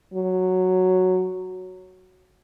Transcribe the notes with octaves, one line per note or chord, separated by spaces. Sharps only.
F#3